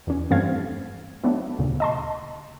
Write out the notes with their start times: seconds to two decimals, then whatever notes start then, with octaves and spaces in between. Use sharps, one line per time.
0.07 E2 C#4
0.31 G2 E3 A3 C4 F5 G#6
1.24 F#3 A3 B3 D4 D#4
1.59 D2 A#2 C#3
1.80 D#5 A5 C6